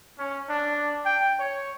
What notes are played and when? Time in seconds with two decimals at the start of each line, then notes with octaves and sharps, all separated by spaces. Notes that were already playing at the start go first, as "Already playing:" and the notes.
0.19 C#4
0.50 D4
1.05 G5
1.39 C#5